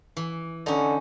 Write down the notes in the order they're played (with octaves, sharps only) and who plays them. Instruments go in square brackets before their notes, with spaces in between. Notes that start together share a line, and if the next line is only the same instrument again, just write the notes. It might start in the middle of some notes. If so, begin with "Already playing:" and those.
[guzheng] E3
[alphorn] D3 [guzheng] C#4 D#4